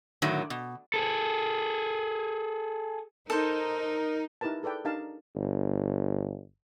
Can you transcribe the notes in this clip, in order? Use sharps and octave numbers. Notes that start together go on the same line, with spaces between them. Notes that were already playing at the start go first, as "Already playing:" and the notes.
A2 D3 D#3 F#3
B2
G#4 A4
D#4 A4 A#4 C5
D#4 E4 G4 A#4 B4 A5
G#4 A4 B4 D5 G5
D4 D#4 G4 A#4 F5 A5
G1